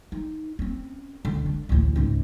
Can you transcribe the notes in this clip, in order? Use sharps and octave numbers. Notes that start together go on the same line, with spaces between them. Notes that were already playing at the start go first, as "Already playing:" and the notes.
D#4
C4 C#4
C#2 D3
D4
A1 D2
C#2 G#2